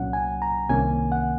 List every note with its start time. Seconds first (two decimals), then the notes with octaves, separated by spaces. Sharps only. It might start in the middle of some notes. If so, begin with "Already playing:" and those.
Already playing: C2 A#2 F#3 C#4 F#5
0.13 G#5
0.42 A#5
0.69 C2 C3 D#3 A#3 C#4 G#5
1.12 F#5